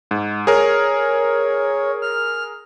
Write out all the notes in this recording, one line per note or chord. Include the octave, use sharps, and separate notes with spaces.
G#2
G#4 A#4 C#5
F6